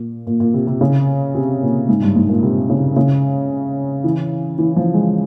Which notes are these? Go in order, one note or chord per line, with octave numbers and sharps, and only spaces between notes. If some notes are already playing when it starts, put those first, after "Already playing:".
Already playing: A#2
A#2
A#2
C3
C3
C#3
C3
A#2
G#2
G2
G#2
A#2
C3
C#3
C#3
E3
E3
F3
G#3